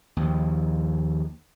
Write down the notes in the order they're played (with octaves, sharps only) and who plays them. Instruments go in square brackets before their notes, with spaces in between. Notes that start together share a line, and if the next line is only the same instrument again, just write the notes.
[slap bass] D#2 F3